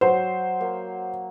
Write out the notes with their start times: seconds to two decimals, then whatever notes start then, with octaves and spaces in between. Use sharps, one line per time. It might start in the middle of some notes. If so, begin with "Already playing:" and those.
0.01 F#3 C5
0.61 A#3